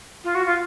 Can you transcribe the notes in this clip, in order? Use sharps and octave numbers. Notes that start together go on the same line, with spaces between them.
F4
F#4
F4